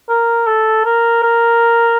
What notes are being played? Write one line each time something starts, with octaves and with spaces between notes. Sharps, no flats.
A#4
A4
A#4
A#4